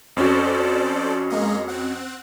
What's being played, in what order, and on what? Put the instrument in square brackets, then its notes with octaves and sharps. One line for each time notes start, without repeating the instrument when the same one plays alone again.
[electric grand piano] F2 C#4 F#4 [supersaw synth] A4 C5 D5
[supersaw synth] G#3 A#3 D#5
C4 F#5